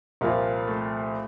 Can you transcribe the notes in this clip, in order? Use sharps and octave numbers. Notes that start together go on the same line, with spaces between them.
C2 A#2 F3 A#3
A3